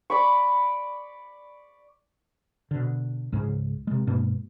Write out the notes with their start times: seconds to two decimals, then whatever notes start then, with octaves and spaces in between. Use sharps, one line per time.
0.10 D5 B5 C#6
2.71 B2 D3
3.32 C#2 G#2 C#3 G#3
3.87 C3 G#3
4.07 G2 B2 G#3 A#3